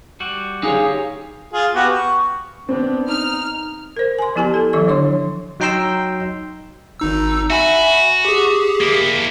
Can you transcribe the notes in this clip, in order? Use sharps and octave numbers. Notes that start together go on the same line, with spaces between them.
G3 F#4
D#4 G4 G#4 C#5 F5 G#5
F4 G#4
B3 F#4 G4
C#6
B3 C4 D4
D#4 F6
A#4 C5
G#5 C6
F3 B3 E4 G4 G#5 A5
A4
D#3 F3 F#3 E4 A4 C#6
D3 D4 C#5 C6
F#3 D#4 G5 A#5 C6 E6
G#1 D#4 E6
F#4 E5 G#5 B5
G4 G#4
A#3 E4